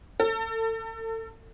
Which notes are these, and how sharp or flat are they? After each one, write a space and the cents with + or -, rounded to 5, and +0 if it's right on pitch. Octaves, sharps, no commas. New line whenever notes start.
A4 +35